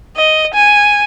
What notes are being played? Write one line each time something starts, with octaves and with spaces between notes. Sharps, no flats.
D#5
G#5